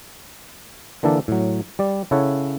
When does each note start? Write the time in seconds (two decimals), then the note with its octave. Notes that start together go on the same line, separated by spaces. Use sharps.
1.03 D3 E3 A#3 D4 A4
1.28 A2 F#3
1.79 G3 D5
2.11 C#3 E4 A4 C#5 F#5